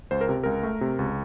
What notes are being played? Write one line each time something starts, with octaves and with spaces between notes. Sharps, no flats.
C#2 C5
A#4
C3
C#2 A#4
A3
C3
C#2